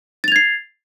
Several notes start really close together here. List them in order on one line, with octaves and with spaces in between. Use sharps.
A6 F7 G#6 C7